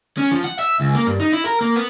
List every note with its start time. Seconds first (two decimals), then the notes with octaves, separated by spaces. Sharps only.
0.17 C#4
0.31 F3
0.44 F#5
0.59 E5
0.80 C#2
0.95 A#3
1.07 G2
1.20 D#4
1.32 E4
1.46 A#4
1.61 A#3
1.76 B3